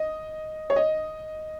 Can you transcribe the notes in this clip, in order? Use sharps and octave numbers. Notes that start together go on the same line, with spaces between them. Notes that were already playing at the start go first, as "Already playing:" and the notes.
Already playing: D#5
C#5
D#5